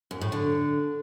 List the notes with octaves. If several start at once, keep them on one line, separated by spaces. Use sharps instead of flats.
F#2
A2
D3